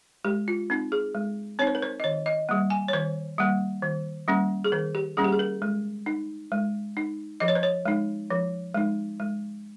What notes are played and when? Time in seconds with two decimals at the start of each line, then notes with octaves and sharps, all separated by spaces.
0.25 G#3 G4
0.48 F4
0.70 C4 D#4
0.92 G#4
1.15 G#3
1.59 C4 D#4 C#5
1.67 C5
1.75 A#4
1.83 C5
2.00 D#5
2.04 D#3 C#5
2.26 D#5
2.49 G3 A#3
2.70 G#5
2.88 C#5
2.93 D#3 C5
3.38 G3 A#3
3.82 D#3
4.28 G3 A#3 C#4
4.64 G#4
4.72 D#3 A#4
4.95 G4
5.17 G3 A#3 C#4 G#4
5.24 G4
5.33 G#4
5.39 A#4
5.62 G#3
6.06 D#4
6.52 G#3
6.97 D#4
7.40 F3 D#5
7.48 C#5
7.55 C5
7.63 C#5
7.85 G#3 D#4
8.30 F3
8.74 G#3 D#4
9.20 G#3